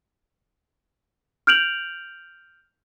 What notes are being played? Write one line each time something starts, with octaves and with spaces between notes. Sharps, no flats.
F6 G6 D7 F7 F#7